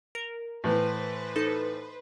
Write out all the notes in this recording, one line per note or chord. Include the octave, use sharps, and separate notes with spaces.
A#4
A2 E3 B4 C5
D#4 A4